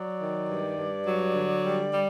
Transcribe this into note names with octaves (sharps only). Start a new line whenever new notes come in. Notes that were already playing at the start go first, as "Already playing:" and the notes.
Already playing: F#3 D5
D#3
G2
G2
F#3
D3
G3
G3